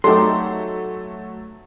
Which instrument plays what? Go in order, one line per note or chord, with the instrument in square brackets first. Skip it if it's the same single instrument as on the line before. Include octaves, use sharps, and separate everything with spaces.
[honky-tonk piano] F#3 A3 [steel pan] D#4 G4 A4 [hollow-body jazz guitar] C6